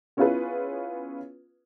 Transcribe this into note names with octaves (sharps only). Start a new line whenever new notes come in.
B3 C#4 E4 F4 G#4 B4